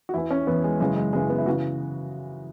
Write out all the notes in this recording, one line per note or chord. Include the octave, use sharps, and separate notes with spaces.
F#4
E2 E3 E4
C#4
E2 E3 B3
G#3
F#2 C#3 E3 G#3
G#3
F#2 C#3 E3 G#3
B3
E4
C#3 E3 F#4